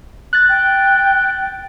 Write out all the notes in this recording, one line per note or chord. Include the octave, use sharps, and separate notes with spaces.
F#6 A6
G5